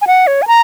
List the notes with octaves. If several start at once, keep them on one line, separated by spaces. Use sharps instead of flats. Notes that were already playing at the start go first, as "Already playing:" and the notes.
G#5
F#5
C#5
G#5
A#5